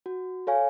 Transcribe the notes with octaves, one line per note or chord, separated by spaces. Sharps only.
F#4
A4 C#5 F5 G#5